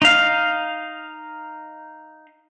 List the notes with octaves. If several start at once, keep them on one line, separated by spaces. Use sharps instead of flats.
D#4 F5